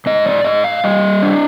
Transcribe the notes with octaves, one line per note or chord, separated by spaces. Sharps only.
G#2 D#5
D5
G#2 D#5
F5
G3 D#5
D4